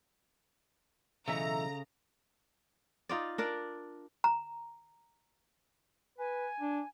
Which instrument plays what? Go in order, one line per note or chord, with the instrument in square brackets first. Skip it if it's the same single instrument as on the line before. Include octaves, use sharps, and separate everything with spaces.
[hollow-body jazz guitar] B1 E3 E5 [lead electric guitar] C#3 [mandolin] A3 [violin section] A#5
[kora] D#4 F4 D5
D4 A#4 D5
[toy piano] A#5
[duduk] B4 [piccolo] G#5
[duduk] D4